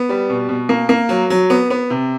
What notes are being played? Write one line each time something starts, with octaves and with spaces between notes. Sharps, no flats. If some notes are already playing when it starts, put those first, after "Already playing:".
Already playing: B3
G3
B2
B2
A#3
A#3
F#3
F#3
B3
B3
C3